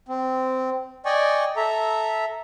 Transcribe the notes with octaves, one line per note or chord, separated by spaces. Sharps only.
C4
D5 D#5 G5 G#5 C#6
A4 E5 A#5